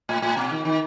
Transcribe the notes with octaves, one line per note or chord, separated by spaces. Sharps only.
A2
A2
B2
D#3
D#3